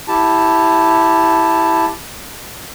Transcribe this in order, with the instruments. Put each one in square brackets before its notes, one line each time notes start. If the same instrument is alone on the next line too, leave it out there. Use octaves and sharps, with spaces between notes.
[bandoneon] E4 G4 A5